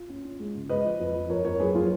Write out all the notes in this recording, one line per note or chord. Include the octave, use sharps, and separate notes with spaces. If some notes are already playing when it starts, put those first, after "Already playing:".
Already playing: F4
C#4
C#4
G#3
C#3
G#3 B4 D#5
F3
F2
F2
F2 A#4 C#5
F2 A#4 C#5
F#3 G#4 B4
F#3 F4 G#4